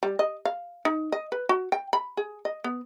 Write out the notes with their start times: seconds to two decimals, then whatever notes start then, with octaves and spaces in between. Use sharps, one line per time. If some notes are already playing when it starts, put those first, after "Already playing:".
0.03 G3
0.19 D#5
0.45 F5
0.85 D#4
1.12 D#5
1.32 B4
1.49 F#4
1.72 G5
1.93 B5
2.17 G#4
2.45 D#5
2.64 B3